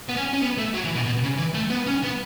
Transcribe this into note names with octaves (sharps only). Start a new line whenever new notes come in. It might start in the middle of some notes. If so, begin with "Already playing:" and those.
B3
C#4
C#4
B3
A3
F#3
E3
B2
B2
C#3
E3
A3
B3
C#4
B3